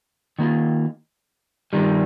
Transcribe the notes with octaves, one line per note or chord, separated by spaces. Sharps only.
D#3 A#3 F4
G2 D#3 G3